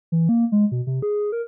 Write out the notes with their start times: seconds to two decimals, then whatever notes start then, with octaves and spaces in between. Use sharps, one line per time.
0.12 E3
0.29 A#3
0.52 G#3
0.72 B2
0.87 C3
1.02 G#4
1.32 A#4